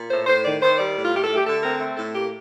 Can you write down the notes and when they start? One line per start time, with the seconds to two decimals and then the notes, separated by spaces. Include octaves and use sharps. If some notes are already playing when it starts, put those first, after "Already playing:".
Already playing: A#2
0.10 A2 C5
0.27 A2 C5
0.44 D#3 D5
0.61 D#3 C5
0.78 G3 D5
0.95 A2
1.05 F4
1.13 A3 G4
1.24 A4
1.30 A3
1.35 G4
1.46 D3 A4
1.63 C4 A#4
1.80 A3
1.97 A2 A4
2.14 A#3 G4